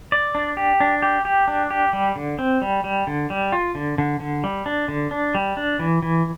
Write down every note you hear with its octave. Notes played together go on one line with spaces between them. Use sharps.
D5
D4
G4
D4
G4
G4
D4
G4
G3
D3
C4
G3
G3
D3
G3
F4
D3
D3
D3
G3
D4
D3
D4
G3
D4
E3
E3